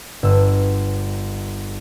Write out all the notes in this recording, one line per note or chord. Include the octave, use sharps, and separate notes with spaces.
G1 E6